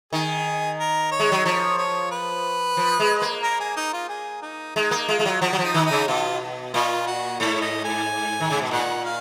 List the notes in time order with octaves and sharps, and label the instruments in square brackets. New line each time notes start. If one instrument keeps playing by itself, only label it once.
[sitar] D#3 [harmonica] G#4
[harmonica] A#4
C#5
[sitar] G#3
F#3
[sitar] F3 [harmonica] C#5
[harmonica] C#5
B4
[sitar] F3
G#3
A#3
[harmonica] A#4
G#4
D#4
F4
G#4
D#4
[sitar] G#3 [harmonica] D#4
[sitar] A#3
[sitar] G#3 [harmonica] F4
[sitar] G#3
F#3
[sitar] F3 [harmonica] F#4
[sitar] F#3
F3
[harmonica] D#4
[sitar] D#3
[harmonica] D#4
[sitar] C#3
[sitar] B2 [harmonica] F4
[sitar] A#2 [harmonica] F4
[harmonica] F#4
[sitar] G#2 [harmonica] C#5
[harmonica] D#5
G#5
[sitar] D#3
C#3
B2
[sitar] A#2 [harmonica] F#5
[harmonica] F5